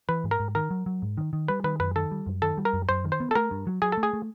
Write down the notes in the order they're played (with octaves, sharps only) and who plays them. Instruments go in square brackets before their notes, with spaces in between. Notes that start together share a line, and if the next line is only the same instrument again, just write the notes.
[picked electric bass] E3 [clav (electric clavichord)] B4
[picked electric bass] G#2
[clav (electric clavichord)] A#4
[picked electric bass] G#2
[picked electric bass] D#3 [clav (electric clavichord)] A#4
[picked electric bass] F#3
F#3
G#2
D#3
D#3
[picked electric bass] G3 [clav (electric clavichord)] B4
[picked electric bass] D#3 [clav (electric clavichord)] B4
[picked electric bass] F#2 [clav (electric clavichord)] B4
[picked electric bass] D#3 [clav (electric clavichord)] A4
[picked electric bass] G3
F#2
[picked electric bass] D#3 [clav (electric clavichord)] A4
[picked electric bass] G3
[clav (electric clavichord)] A#4
[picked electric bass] F#2
[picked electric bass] F#2 [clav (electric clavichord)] C5
[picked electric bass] D#3
[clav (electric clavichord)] C5
[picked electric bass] B3
[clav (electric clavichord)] A4
[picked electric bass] A3 [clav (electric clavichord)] A#4
[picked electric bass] G2
F#3
[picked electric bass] F#3 [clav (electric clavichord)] G#4
[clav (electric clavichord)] A4
[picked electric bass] A3
[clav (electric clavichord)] G#4
[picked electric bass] A3